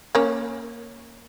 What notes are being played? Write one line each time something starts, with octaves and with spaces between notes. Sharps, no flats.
A#3 C#4